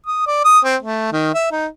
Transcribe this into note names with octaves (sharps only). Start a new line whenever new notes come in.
D#6
D5
D#6
C4
A3
D#3
E5
D#4